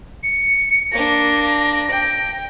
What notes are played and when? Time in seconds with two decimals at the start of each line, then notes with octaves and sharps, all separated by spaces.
0.23 C#7
0.92 A#3 D4 A#6
1.91 G5